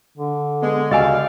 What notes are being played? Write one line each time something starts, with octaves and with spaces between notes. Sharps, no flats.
D3
G#3 B3
C#2 G3 F#4 D#5 F5 G#5 E6